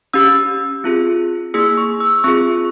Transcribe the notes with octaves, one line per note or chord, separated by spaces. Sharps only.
C#4 G4 E6
C4 F4 G#4
A#3 E4 G#4 E6
C#6
E6
C4 F4 G#4 C#6